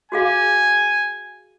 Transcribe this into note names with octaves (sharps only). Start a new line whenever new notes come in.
F#4 G#4 F5 G#5